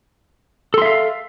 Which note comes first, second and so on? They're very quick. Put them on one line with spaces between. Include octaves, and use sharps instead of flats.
A4 C6 E5 F5